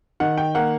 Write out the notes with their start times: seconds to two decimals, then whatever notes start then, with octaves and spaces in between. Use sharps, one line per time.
0.20 D#3 F#5
0.38 G5
0.55 A#3 F#5